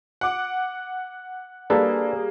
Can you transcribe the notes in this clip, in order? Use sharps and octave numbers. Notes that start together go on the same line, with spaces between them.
F#5 D6
G3 A#3 D4 G#4 A4 B4